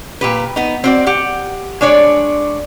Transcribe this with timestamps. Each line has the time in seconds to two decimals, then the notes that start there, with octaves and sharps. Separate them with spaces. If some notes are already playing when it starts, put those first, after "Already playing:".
0.21 A#2 G4 B4
0.56 B3 D#4
0.84 C4 F#4 D5
1.06 G4 F#5
1.81 G#3 D4 C#5 D5